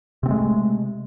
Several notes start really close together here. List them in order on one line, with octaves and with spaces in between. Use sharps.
C3 C4 A3 G#3